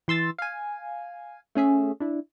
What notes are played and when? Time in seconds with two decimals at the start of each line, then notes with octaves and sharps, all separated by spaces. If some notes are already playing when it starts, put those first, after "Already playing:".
0.08 E3 C6 E6 A6
0.39 F5 G#5
1.55 A3 C#4 G#4 E5
2.00 D4 E4